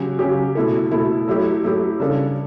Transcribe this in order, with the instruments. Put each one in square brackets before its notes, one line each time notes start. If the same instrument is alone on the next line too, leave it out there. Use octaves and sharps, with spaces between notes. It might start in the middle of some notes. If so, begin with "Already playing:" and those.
Already playing: [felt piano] C#3 F#3 C#4 G4
C#3 F#3 C#4 G4
B2 A3 E4 A4
B2 A3 E4 A4
F#3 A3 E4 G4
F#3 A3 E4 G4
C#3 G3 D4 A4